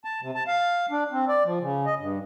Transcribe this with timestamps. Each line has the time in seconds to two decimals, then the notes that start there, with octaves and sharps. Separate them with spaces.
0.04 A5
0.22 C3
0.35 A5
0.47 F5
0.90 D4
1.12 C4
1.29 D5
1.45 F3
1.61 C#3
1.86 D#5
1.99 G2